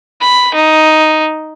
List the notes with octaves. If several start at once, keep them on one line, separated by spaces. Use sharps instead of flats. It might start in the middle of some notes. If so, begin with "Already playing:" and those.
B5
D#4